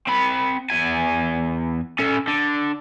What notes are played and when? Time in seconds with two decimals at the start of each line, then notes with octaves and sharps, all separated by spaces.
0.07 C4 B5
0.70 E2 G#5
1.99 C#4 A4
2.28 D3